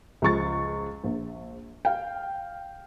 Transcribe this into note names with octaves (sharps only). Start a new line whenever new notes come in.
C#2 F3 C#6 A6
A#1
F5 G5